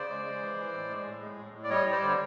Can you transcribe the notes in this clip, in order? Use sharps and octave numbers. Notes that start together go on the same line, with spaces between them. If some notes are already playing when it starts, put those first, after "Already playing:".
Already playing: C#3 C5 D5
G#3
G#3
E3
E3
A2
G#3
A2
G#3
A2
A2
D5
G3 C#5 D#5
G3
C5 D5
D3
C#5